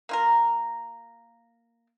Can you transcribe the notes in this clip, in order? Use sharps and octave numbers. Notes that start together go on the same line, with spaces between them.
A#3 F4 A#4